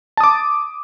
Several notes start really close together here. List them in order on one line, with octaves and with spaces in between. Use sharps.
A5 D#6 D6